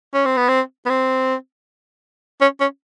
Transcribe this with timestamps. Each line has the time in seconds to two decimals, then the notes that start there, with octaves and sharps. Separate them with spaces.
0.14 C#4
0.26 C4
0.37 B3
0.49 C4
0.86 B3
0.90 C4
2.41 C#4
2.60 C#4